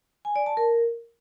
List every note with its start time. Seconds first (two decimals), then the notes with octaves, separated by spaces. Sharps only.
0.25 G#5
0.36 D5
0.46 A5
0.57 A#4